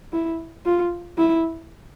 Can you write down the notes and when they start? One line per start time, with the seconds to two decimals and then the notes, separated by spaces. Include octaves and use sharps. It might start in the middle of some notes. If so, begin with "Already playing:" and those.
0.13 E4
0.65 F4
1.18 E4